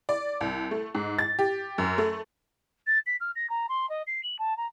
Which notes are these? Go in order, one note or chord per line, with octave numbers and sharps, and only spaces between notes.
D5
C2
A3
G#2
A6
G4
F#2
A3
A6
B6
F6
A#6
A#5
C6
D#5
C7
F#7
A5
A#5